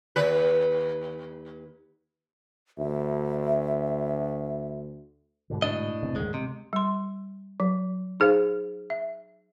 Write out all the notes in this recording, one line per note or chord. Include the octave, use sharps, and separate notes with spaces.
D#2 B4
D2 E5
G#2 B2 D3
A2 D4 D#5
F1 C3 C4
D1 G#2 D#3 G#3
C3 G#3
G3 C6
F#3
D#4 G#4 C5 F5
E5